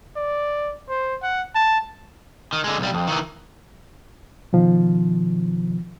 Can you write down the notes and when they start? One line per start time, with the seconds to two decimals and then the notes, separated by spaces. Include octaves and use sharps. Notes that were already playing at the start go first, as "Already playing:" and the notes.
0.17 D5
0.89 C5
1.23 F#5
1.55 A5
2.53 D#3
2.64 D3 G#3
2.79 B1 G3
2.94 F2
3.08 D#3 E3
4.53 B2 D#3 F3